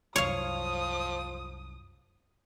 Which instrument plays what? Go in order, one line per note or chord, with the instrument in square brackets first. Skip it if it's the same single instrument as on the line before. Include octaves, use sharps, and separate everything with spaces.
[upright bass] C2 F#2 [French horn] F3 [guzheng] C#5 F5 [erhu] D#6